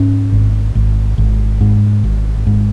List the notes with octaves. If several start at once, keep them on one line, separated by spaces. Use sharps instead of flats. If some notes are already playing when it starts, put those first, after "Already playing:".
Already playing: G#2 C#4
G#1
G#1
G#1
G#2
G#1
G#2